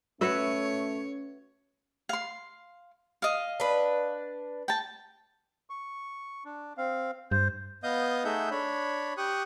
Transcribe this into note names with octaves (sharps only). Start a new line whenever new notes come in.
A3 C#4 F#4 B4 C#5 E5
F5 C6
D#5 F5
D4 B4
G5 A5
C#6
D4
C4 F5
G2 C5
B3 D#5 F5 D#6 G6
A3 D#4 G#4 E5 F#5 G6
D4 C#5 B5
G4 C#6 D#6 F#6